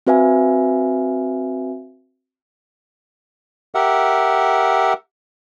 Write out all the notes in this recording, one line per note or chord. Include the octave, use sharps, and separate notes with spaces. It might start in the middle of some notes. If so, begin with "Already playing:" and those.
C4 F#4 B4 E5 F5 G#5
G4 A#4 E5 F#5